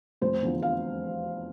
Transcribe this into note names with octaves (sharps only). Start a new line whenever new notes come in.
F1 C5
E2 D3 F3
F5